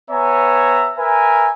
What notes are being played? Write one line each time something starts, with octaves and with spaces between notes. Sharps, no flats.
B3 C#5 E5 G#5 A#5
A#4 B4 E5 G#5